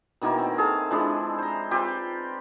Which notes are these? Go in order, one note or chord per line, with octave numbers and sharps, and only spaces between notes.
B2 D#3 E3 A#3
C4
G#4 A4 F5
F3 G#3 D4 E4
C5 A#5
C4 F4 G4 B4